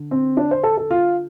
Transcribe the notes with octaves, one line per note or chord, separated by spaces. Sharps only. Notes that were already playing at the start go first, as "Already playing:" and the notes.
Already playing: D3
C4
D4
C5
A4
A4
F4